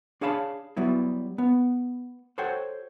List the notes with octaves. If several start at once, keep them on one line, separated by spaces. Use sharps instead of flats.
D4 G#4 C#5 F5 A5 B5
F#3 G3 B3 E4
B3
F#4 A4 C5 C#5 F#5 G5